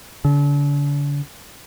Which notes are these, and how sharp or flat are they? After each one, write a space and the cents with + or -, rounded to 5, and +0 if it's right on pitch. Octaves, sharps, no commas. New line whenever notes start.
D3 -40